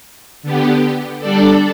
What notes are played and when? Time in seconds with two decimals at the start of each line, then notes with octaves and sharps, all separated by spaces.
0.43 D3 B3 G4
1.20 G3 D4 A4 D5